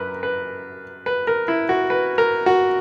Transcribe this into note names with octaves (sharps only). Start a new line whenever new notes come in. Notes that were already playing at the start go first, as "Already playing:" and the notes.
Already playing: F#2 A#4 B4
B4
B4
A#4
E4
F#4
B4
A#4
F#4